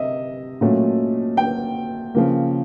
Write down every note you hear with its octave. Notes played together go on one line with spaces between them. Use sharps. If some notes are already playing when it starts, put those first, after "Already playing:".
Already playing: C3 D#5 E5
A#2 F#3 A3 C#4
G5
C#3 F3 A#3